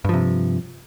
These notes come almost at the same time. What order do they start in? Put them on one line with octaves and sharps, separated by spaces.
G2 F3 C3